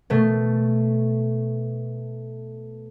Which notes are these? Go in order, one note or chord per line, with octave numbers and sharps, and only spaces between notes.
B2 A3